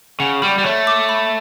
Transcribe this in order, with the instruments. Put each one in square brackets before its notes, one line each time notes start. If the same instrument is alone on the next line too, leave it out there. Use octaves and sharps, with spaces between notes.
[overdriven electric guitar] C#3 [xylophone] F#5
[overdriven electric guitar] G3 [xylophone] B5
[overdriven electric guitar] G3
[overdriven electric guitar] A3 [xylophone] C#5
[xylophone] D6
B5